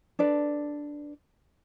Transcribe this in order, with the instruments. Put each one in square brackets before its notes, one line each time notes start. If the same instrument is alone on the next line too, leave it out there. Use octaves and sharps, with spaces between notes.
[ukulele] D4 A4 B4 D5